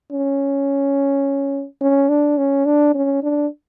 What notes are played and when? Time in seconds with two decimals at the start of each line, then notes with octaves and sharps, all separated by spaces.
0.11 C#4
1.81 C#4
2.09 D4
2.38 C#4
2.66 D4
2.95 C#4
3.23 D4